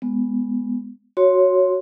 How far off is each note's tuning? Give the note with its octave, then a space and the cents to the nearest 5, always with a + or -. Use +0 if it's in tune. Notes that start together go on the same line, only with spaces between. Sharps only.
G#3 +0 B3 +0
F#4 +0 C#5 +0 C6 +0